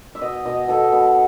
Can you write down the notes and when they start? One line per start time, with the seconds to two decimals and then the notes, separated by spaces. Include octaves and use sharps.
0.15 E5
0.21 B2 D#5
0.45 B2 D#5
0.68 B2 A4
0.92 B2